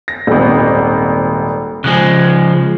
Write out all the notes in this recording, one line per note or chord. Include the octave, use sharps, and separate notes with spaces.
A#6
D#1 G#1
C#3 F3 G#3 F#6